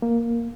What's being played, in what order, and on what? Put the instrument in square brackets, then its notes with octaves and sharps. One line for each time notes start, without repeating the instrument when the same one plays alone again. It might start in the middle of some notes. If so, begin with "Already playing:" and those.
[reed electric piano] A#3